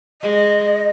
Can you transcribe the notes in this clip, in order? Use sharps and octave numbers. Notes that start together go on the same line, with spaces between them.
G#3 D#5